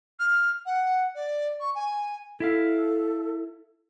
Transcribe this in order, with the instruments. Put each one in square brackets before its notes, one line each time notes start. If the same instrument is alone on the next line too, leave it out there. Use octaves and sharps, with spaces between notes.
[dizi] F6
F#5
D5
C#6
G#5
[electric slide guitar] E4 E5 F5 [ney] A4